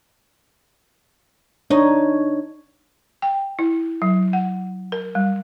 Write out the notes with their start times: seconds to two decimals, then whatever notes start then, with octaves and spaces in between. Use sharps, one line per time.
1.70 D4 D#4 C#5
3.22 G5
3.59 E4
4.02 F#3
4.33 F#5
4.92 A#4
5.15 G3